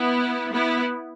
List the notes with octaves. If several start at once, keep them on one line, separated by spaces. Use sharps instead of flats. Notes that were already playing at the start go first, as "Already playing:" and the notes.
Already playing: B3 E4
B3 E4